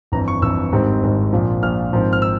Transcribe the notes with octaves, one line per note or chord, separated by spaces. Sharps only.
G1 F2 E3 A#5
C#6
G1 F2 E3 E6
G#1 G#2 G3 C4
G#1 G#2 G3 C4
A#1 A#2 F3
A#1 A#2 F3 F6
G#1 G#2 F3 C4
F6
E6